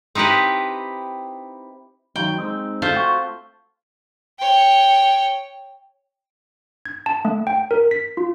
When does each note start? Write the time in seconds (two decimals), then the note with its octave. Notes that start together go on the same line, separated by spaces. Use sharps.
0.15 C4 D#4 E4 G4 B4
2.16 D#3 F#3 D#4 G5
2.38 G#3 C4 D#4
2.82 A3 F4 C5
2.96 C4 F#4
4.39 C#5 G5
6.86 G#6
7.06 A5
7.25 A3
7.47 G5
7.71 A#4
7.91 B6
8.17 F4